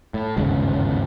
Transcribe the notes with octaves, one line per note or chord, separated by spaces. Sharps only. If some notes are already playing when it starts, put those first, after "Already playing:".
A2
G1 D#2 G#2 C#3